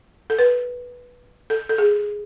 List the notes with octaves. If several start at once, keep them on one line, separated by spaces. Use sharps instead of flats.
A4
B4
A4
A4
G#4